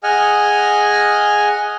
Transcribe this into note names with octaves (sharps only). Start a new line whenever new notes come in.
G#4 D#5 F#5 G#5 F6